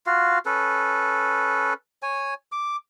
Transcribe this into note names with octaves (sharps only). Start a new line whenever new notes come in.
F4 F#4 F5
C#4 A4 B4
C#5 G#5
D6